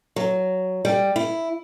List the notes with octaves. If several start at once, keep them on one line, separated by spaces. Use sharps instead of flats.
F#3
G3
E4